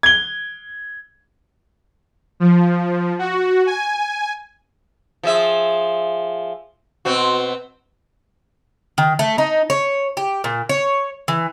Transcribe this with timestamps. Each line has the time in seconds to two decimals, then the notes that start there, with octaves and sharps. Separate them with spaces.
0.03 G#6 G7
2.40 F3
3.19 F#4
3.66 G#5
5.23 F3 G#4 E5
7.05 B2 C4 F#4
8.98 D#3
9.19 A3
9.38 D#4
9.70 C#5
10.17 G4
10.44 A#2
10.69 C#5
11.28 E3